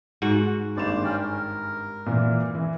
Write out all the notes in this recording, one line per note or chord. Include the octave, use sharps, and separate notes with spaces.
G#2 F#4 F#5
G#1 G2 A#3 C5 D5 E7
C#4 A#4 G5
A#4
A#2 E3
E3